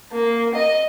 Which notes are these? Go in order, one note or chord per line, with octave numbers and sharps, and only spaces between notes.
A#3
D#5